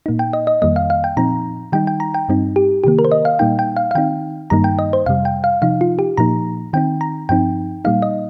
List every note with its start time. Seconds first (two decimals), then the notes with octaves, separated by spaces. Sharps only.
0.06 A#2 A#3 D#4
0.19 G5
0.33 D#5
0.47 D#5
0.62 F2 D#3 G3 A#3 D#5
0.76 F5
0.90 F5
1.04 G5
1.17 A#2 F3 C4 D#4 A#5
1.72 D#3 G3 D#4 G5
1.87 G5
2.00 A#5
2.14 G5
2.29 G2 G3 C4 D#4
2.56 G4
2.84 C3 D#3 A#3 G4
2.99 A#4
3.05 C5
3.12 D#5
3.25 F5
3.39 A#2 G3 A#3 D#4 G5
3.59 G5
3.77 F5
3.91 F5
3.95 D#3 C4 D#4 G5
4.50 G2 D#3 G3 A#3 D#4 A#5
4.64 G5
4.79 D#5
4.93 C5
5.06 F2 C3 G3 F5
5.25 G5
5.44 F5
5.62 C3 F3 D#4 F5
5.81 F4
5.99 G4
6.17 A#2 F3 A#3 D#4 A#5
6.73 D#3 C4 D#4 G5
7.01 A#5
7.29 G2 F3 C4 D#4 G5
7.85 A#2 G3 A#3 D#4 F5
8.02 D#5